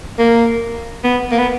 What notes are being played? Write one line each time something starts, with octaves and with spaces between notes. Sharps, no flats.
A#3
B3
A#3
B3